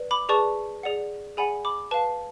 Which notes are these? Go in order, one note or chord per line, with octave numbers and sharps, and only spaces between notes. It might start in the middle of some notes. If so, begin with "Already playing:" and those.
Already playing: B4 D5
B5 D6
G#4 B4 D5 A5 C#6
G#4 D5 F#5
G#4 D5 F#5 G#5 B5
B5 D6
B4 F5 A5